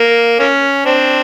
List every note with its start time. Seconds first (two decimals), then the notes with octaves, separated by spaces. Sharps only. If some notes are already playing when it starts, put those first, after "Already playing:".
Already playing: A#3
0.40 A#3 C#4
0.85 C4 D4